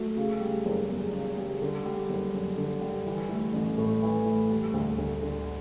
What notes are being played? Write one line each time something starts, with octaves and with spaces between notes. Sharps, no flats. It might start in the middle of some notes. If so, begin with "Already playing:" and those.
Already playing: F#3 A3
C#3
G3
F#1
E2
C#3
G3
D3
G3
F#1
F#2
D3
G3
E3
A3
A1
A2
E3
A3
G3
D2
D2
D3